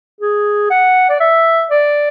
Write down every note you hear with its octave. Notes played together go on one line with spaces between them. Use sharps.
G#4
F#5
D5
E5
D5